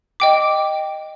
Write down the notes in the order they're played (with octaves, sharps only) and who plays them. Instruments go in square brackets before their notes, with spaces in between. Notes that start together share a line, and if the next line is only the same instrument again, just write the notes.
[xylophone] D#5 G5 D6